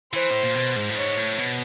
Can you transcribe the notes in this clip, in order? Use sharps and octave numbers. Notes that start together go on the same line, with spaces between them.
E3 C5
A2
A#2
B2
G#2
A2
G#2 C#5
A2
B2